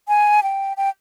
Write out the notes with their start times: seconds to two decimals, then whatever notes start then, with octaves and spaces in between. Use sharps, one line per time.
0.08 G#5
0.43 G5
0.77 G5